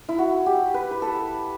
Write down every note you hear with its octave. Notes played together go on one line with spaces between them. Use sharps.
E4
F#4
G4
B4
B4
A4